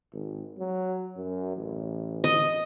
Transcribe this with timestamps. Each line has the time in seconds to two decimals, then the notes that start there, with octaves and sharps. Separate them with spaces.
0.13 G#1
0.59 F#3
1.17 F#2
1.57 A1
2.24 D#5